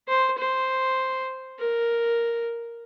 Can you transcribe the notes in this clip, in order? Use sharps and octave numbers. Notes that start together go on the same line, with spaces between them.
C5
C5
A#4